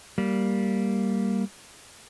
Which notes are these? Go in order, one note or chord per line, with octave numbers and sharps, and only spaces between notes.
G3 A#3